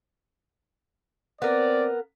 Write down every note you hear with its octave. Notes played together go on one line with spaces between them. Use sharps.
B3 C4 A#4 D5